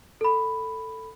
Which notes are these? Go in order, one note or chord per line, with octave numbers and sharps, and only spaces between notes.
A4 B5